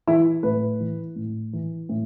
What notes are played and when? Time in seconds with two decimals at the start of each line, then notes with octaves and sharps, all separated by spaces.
0.07 E3 E4
0.43 A2 B4
0.80 E3
1.16 A2
1.53 E3
1.89 A2